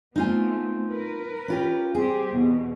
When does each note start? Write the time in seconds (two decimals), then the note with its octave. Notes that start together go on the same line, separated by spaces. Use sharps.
0.16 A3 B3 C4 D#4 F4 G#5
0.90 A#4 B4
1.48 C#4 F4 G4
1.95 G3 C4 G4 G#4
2.31 E2 B2